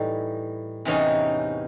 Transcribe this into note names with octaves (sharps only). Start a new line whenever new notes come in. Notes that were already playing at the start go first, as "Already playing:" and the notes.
Already playing: A2 E3 G3 D#4
E2 C3 E3 C#4 D#4